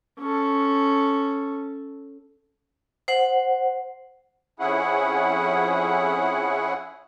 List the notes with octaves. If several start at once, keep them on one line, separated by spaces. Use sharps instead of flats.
C#4 A4
C5 F#5
F2 C#4 E4 G#4 F#5